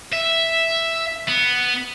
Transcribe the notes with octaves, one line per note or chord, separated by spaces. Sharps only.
E5
B3